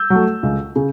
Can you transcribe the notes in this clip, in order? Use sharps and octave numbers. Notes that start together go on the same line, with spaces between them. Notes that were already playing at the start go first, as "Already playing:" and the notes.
Already playing: E6 G6
F#3 A3
C#2
C#3